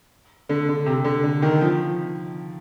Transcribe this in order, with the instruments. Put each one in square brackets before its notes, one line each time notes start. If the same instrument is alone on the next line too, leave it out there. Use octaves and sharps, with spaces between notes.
[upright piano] D3
D3
C3
D3
D3
D#3
F3